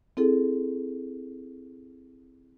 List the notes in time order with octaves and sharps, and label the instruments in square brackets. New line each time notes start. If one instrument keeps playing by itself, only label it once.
[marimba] C4 E4 G#4 A4